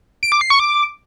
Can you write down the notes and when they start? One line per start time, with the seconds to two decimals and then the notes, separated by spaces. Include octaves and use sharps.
0.23 D7
0.32 D6
0.41 C7
0.50 C#6
0.60 D6